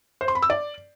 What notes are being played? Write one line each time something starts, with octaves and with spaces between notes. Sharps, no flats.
C5
C6
B5
E6
D5